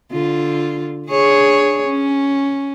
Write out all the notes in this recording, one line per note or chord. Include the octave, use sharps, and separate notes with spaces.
D3 F4
D4 G#4 C#5
C#4